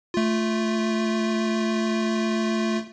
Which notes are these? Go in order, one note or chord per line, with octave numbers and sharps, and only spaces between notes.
A3 F4